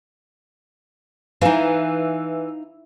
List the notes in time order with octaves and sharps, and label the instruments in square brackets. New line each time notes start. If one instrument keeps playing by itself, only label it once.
[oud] E3 [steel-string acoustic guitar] D#4 F5